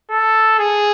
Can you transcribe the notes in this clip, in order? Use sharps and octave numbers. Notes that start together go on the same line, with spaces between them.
A4
G#4